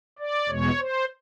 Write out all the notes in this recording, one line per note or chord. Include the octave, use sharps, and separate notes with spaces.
D5
E2 B2 G#3 C#5
C5